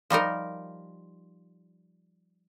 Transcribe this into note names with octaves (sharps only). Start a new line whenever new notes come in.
F3 G3 D#4 A#4